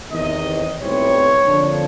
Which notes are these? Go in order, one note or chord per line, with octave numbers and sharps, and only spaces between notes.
E2 C3 D#3 D#5
B1 A2 E3 G3 C4 C#5
F2 D3 F3 A#3 D4